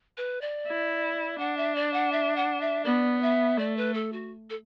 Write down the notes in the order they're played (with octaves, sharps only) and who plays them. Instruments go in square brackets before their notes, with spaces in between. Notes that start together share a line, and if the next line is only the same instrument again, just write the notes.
[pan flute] B4
D5
[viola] E4
[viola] D4 [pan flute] F#5
[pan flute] E5
D5
F#5
E5
F#5
E5
[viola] B3 [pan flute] D5
[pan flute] E5
[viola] A3 [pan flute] D5
[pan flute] B4
A4
F#4
A4